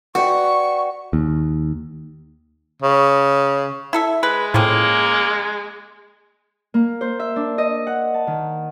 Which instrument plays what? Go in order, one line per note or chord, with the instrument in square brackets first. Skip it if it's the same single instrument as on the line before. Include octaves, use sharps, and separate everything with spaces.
[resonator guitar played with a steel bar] F#4 [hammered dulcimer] B4 D5 G5 [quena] C#6
[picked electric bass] D#2
[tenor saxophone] C#3
[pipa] E4 A4 E5
[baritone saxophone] G#3 [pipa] B4
[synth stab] A2 [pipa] F3 C4 C#4 [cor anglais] A#3
[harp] A#3
C5
E5
D4
D#5
F#5
A5
D#3